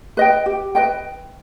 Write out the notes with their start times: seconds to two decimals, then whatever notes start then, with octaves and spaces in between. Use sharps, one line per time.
0.17 B4 D#5 G5
0.46 G4
0.75 B4 D#5 G5